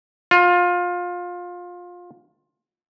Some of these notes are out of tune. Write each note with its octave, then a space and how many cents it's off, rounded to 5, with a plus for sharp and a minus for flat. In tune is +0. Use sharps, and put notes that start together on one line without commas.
F4 +20